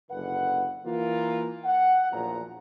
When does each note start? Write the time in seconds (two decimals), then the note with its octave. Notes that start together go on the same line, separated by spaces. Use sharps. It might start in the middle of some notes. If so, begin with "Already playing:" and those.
0.11 F#1 D3 B4 F#5
0.85 E3 A#3 F4
1.64 F#5
2.12 A#1 E2 A#2 F3 F#3 A#5